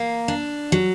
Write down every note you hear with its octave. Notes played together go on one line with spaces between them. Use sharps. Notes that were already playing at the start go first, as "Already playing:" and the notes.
Already playing: A#3
D4
F#3